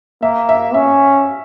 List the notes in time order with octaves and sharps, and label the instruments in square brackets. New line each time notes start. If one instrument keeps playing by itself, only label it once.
[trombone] A#3 [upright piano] E5
[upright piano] E5
[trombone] C#4 [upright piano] E5